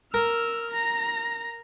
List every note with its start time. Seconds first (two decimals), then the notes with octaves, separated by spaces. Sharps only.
0.14 A#4 E6 F6
0.71 A#5 A#6